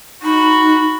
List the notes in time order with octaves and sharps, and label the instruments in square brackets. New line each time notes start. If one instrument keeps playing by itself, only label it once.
[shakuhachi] D#4 [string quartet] F#4 B5